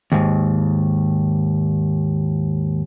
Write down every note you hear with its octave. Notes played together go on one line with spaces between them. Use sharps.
D#2 G#2